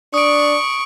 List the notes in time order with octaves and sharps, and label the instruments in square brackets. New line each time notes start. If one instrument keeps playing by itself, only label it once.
[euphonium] D4 [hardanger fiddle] C#6 [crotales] D#6 D7